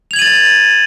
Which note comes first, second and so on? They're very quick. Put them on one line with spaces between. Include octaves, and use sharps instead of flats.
F7 G#6 F#7 D#7 A6